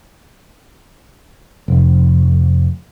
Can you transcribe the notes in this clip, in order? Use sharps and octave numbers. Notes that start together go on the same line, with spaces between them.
F1